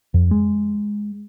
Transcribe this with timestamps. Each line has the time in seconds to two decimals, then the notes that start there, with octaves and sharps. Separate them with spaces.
0.14 F2
0.31 G#3